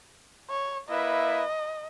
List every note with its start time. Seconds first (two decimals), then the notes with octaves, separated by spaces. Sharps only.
0.50 C#5
0.89 A#3 E4 B4 D#5 E5